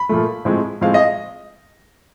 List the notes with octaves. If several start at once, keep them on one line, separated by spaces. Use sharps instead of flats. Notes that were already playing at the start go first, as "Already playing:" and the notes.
Already playing: B5
A#2 F3 A3
A2 F3 G#3 C4
A2 F3 G#3 C4 F5
D#5